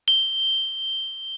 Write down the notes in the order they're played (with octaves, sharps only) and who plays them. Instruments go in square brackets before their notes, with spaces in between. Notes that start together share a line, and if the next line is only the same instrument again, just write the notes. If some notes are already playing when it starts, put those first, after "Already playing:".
[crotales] G7